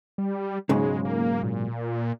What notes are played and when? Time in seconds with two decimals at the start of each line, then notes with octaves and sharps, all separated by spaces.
0.18 G3
0.69 B1 G#2 C#3 G#3
1.05 A#3
1.43 A#2